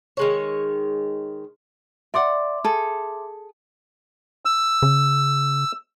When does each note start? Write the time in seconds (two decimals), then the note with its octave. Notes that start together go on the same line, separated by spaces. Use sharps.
0.17 D#3 G#3 C#5
2.14 D5 E5 F#5 C6 D6
2.64 G#4 A4
4.45 E6
4.82 C#3